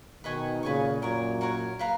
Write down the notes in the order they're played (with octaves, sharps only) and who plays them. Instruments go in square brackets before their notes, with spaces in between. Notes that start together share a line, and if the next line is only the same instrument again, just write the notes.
[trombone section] B2 D#3 [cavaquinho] B4 D#5 G#5 C#6
[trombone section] A#2 C#3 [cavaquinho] B4 D#5 G#5 C#6
[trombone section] F#2 A#2 [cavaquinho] F#4 A#4 C#5
[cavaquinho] F#4 A#4 C#5
B4 F5 A#5